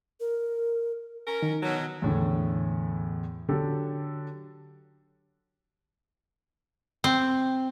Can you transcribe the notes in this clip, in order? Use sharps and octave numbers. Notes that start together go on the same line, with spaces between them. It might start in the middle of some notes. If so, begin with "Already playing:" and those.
A#4
C#4 A#4
D#3
B2 F#3
E2 A2 D3
D3 F#3 G4 A4
C4